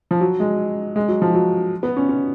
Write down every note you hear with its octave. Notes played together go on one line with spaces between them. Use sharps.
F3
F#3
G#3
G#3
F#3
F3
F#3
B3
C#4
C#4